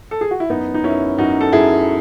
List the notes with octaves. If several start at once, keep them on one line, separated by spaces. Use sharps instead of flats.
A4
G#4
F#4
E4
F#2 B3 D#4
D#4
F#2 C#4 E4
F#2 D#4 F#4
A4
F#2 E4 G#4